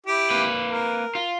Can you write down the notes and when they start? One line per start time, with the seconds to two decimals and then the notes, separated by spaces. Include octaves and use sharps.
0.06 E4 G4
0.30 A#3 B4
0.70 A#4
1.15 F4